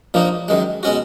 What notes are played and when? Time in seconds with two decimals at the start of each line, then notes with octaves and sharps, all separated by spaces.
0.14 A#1 A#2 F3 A#3 D#4
0.48 F#2 D#3 G#3
0.83 B2 G#3 C#4 F#4